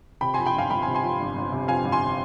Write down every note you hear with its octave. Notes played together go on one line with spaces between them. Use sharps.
C3 G5 B5
F2 G#5 C6
G5 B5
G1 F5 G#5
G1 G5 B5
G#5 C6
C3
G#5 C6
F2
G1
G1
C3
F2 F5 G#5
G1
G#5 C6